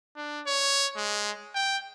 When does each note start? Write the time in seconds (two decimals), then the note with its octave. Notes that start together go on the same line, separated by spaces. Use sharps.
0.16 D4
0.46 C#5
0.97 G#3
1.55 G5